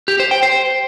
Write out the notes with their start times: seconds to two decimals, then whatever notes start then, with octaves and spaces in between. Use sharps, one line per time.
0.08 G4
0.20 C5
0.31 G5
0.43 C5